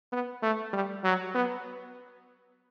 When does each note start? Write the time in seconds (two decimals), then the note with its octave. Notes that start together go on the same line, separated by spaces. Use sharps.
0.12 B3
0.42 A3
0.73 G3
1.04 F#3
1.35 B3